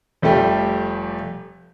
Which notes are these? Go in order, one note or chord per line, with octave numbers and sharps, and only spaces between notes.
F1 F3 G3 A3 G4